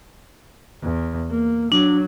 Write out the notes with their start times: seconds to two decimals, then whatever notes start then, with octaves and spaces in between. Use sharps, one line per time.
0.83 E2
1.30 A#3
1.72 F#3 D4